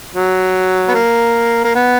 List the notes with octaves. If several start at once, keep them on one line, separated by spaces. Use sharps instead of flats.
F#3
B3
A#3
A#3
B3